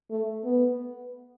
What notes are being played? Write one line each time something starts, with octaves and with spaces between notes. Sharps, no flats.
A3
B3